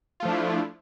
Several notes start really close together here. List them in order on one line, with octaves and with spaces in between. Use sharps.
F4 A3 F3 D4 E4